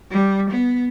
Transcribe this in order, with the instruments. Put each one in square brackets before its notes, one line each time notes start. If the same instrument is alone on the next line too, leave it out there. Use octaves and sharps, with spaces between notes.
[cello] G3
B3